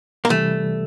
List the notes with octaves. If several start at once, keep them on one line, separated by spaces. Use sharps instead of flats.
A#3
C3 E3 G3 A3